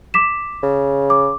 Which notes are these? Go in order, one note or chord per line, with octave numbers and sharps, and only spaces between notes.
D6 B6 E7
C#3
D6